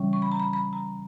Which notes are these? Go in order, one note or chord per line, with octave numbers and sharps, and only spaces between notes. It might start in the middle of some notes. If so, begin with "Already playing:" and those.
Already playing: C#3 E3 G3 C#4
C#6
B5
A#5
B5
B5
A#5